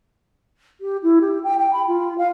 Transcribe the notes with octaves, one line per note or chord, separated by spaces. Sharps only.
G4
E4
G4
G5
G5
B5
F4
F5